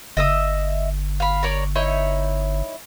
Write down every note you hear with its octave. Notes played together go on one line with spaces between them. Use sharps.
G1 D#5 E5 D#6
F5 B5
A#4 C#5 D5
D#4 E4 C#5